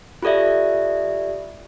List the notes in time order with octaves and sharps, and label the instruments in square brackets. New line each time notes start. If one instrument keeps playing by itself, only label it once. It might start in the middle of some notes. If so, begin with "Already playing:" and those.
[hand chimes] F4 G4 A4 D5 E5